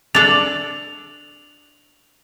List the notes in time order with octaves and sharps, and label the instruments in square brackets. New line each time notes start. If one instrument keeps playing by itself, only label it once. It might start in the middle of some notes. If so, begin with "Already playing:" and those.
[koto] D4 A4 [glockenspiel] F7 F#7